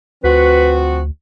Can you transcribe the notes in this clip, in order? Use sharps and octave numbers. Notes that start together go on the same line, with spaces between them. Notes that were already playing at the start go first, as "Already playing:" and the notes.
D2 F3 C4 F#4 B4